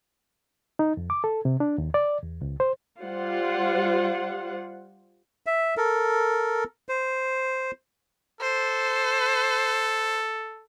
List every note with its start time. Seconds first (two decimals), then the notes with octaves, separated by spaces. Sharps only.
0.79 D#4
0.97 F2
1.10 D6
1.24 A4
1.45 C3
1.60 D4
1.78 D#2
1.94 D5
2.23 E2
2.41 C#2
2.60 C5
3.02 G3 F4 C5 F#5
5.46 E5
5.77 A4 A#4
6.89 C5
8.41 A4 C5